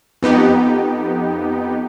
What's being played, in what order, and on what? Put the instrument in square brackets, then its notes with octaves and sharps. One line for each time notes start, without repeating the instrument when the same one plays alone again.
[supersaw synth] F2 B3 D#4 G4